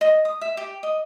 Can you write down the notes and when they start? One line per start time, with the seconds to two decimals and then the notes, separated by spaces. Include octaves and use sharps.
0.01 D#5
0.25 D#6
0.41 E5
0.57 G4
0.83 D#5